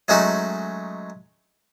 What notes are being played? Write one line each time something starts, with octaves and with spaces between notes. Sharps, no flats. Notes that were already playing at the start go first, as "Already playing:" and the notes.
F#3 G#3 A3 C#4 D#4 F#4